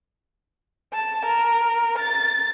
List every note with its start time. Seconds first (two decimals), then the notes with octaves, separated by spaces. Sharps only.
0.94 A5
1.26 A#4
1.99 A6